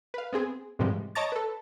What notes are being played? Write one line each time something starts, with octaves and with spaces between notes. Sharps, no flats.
B4 F5
B3 C4 G#4
G#2 C3 E3 F3 G3 G#3
C#5 D#5 A5 A#5 D6 A6
A4 B4